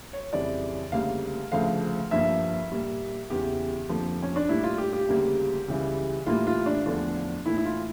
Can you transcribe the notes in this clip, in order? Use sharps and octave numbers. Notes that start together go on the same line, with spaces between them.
C#5
F2 C#3 E3 G3 D5
D2 C#3 G3 A#3 F5
D2 C#3 F3 A3 F5
G2 F3 A#3 E5
A#2 G3 A#3
E2 C#3 E3 G4
F2 D3 F3 A#3
C#4
D4
A2 G3 A#3 E4
F4
G4
G4
D2 C#3 G3 A#3
C#2 C#3 E3 G3
A2 E3 G3 A#3 F4
F4
D4
E2 D3 F3 A3 D4
A2 E3 A#3 E4
E4
F4